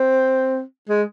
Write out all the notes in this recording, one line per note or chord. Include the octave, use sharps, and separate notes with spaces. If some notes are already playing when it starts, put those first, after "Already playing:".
Already playing: C4
G#3